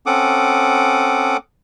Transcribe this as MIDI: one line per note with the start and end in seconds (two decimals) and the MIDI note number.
0.06 1.37 60
0.06 1.37 61
0.06 1.37 69
0.06 1.37 78
0.06 1.37 86
0.06 1.37 87